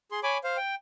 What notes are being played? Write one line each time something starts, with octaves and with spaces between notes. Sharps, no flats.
G#4 C6
C#5 G#5 B5 D6
C5 F5
G5